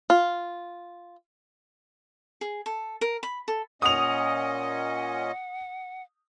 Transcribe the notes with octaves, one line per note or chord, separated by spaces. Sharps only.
F4
G#4
A4
A#4
B5
A4
A#2 C#4 D#5 F#5 D#6 F7